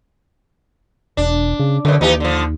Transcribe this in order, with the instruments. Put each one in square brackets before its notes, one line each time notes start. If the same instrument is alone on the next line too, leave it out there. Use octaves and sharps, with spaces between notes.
[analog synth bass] E1 [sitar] D4
[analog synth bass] C#3
[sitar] F#2 B2 [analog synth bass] D3
[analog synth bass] D#2 [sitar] E3 D#4 G4
[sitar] D3 F3